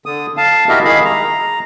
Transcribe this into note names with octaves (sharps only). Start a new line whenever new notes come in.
D3 D#6
F5 A5
E4 F#4 G4 A#4 D#5 E5
D#3 G#3 G#4 F5 B5
A#5